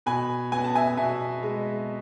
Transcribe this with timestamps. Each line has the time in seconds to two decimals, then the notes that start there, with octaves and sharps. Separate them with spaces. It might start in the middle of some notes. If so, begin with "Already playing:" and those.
0.06 B2 G#5 B5
0.52 B3 G#5
0.64 A5
0.75 E5 G#5
0.97 B2 E5 G#5
1.43 G#3